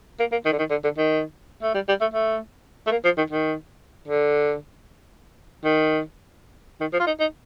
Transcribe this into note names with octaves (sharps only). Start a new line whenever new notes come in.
A#3
A#3
D#3
D3
D#3
D3
D3
D#3
A3
G3
G3
A3
A3
A3
A#3
F3
D#3
D#3
D3
D#3
D#3
F3
F4
D#4
D#4